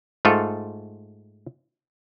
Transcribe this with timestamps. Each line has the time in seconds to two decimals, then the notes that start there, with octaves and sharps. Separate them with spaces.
0.25 G#2 A3 F4 A4